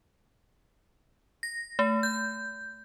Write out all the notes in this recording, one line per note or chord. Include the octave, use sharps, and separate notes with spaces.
A#6
A3
G6